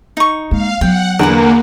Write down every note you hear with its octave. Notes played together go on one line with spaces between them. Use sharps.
D#4 C#6
G#3 A#3 F5
F#3 B3 F#5 G5
E2 D3 A#3 A#4 B4 F#5